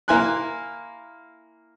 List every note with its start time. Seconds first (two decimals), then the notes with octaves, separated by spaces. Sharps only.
0.08 A#3 E4 G#5 C6 F#6